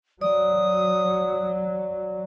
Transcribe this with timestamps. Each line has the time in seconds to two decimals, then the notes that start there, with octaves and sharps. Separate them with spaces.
0.21 F#3 D5 D#6